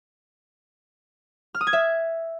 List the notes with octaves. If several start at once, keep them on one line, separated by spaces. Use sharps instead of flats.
F6
D#6
G#6
E5